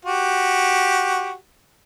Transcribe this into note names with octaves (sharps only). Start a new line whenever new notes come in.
F#4 G4